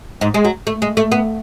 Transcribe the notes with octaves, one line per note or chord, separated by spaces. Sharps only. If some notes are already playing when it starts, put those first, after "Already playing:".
G#2
G#3
F#3
A3
G#3
A3
B3